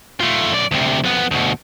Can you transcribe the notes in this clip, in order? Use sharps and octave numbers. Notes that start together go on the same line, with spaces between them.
A3 F4
F#2 D5
D2 C3
F2 B3
D2 B2